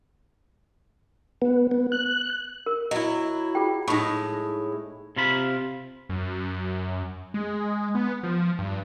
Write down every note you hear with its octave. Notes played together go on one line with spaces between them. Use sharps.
B3
B3
F#6
A#4
F#3 E4 D#5
F4 G#4 G5
A2 G#3 D#4 C#6
C3 F4 B5
F#2
G#3
B3
F3
G2